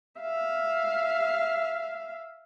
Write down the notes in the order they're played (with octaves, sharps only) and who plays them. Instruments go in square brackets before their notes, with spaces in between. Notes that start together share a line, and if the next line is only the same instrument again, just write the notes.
[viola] E5 F5